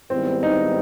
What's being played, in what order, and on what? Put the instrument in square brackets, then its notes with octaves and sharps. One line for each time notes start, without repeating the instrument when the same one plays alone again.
[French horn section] G#2 D#3 G3 B3 E4 [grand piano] C4
[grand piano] D#4